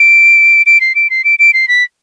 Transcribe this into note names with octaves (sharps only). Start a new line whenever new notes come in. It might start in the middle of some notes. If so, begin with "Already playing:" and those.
Already playing: D7
D7
C7
D7
C7
D7
D7
C7
B6